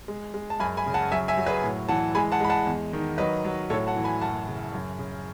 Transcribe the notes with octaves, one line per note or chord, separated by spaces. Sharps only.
G#3
G#3
A5
F#2 G#5 B5
G#5 B5
C#3
F#5 A5
F#3 E5 G#5
E5 G#5
F#3
G#4 B4
A2
E3 F#5 A5
G#3 G#5 B5
F#5 A5
G#3 B5
F#5 A5
E2
D#3
F#3 B4 D#5
F#3
A2 A4 C#5
F#5 A5
E3
G#5 B5
F#2 F#5 A5
C#3
F#2
C#3